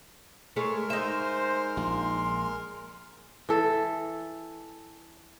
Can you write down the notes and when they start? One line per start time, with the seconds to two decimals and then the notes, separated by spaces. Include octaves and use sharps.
0.56 G#3 A3 G#4 A#4 C#5 F6
0.90 D#4 C5 E5
1.77 A#1 C6
3.49 E3 A4